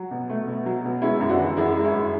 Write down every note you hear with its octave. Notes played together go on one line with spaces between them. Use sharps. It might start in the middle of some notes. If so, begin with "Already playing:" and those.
Already playing: F#3 F#4
B2
A3
B2
F#3
B2
G#3 C#4 E4
F#2
D4 F#4
E3
F#2 E4 G#4
G#3
C#4 E4
F#2